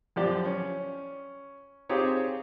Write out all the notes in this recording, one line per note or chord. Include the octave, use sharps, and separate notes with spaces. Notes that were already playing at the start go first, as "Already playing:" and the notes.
F#2 F3 G4 D5
C#4
C4 D#4 F4 G4 G#4 C#5